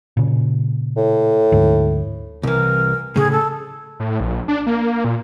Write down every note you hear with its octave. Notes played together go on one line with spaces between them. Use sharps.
A#2 C#3
A2
D2 G#2
C2 E3 A#4
A2 C#3 G#4
A4
A2
A#1
D4
A#3
A#2